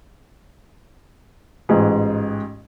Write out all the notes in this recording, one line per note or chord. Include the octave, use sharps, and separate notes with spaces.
A1 G#2 F4 G#4